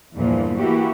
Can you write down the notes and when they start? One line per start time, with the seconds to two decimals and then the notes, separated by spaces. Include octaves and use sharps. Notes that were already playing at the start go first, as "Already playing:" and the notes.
0.16 E2 G2 A#2 E3 F3
0.58 E3 A#3 E4 F#4 G4